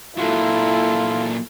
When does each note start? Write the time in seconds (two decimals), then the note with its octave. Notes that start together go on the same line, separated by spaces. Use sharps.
0.18 A#2 F#3 E4 F4 A4